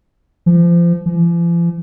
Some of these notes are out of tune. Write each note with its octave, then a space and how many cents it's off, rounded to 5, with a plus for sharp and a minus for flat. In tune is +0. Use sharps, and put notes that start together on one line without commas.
F3 -30
F3 -45